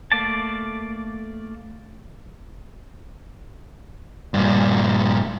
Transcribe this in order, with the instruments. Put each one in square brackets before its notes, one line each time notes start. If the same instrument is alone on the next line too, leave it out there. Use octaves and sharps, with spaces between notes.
[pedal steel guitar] A3 A#3 D5 A5
[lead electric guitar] G2 A#2